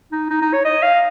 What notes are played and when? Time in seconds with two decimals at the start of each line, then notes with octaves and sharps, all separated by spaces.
0.12 D#4
0.30 D#4
0.42 D#4
0.53 C#5
0.65 D#5
0.83 F5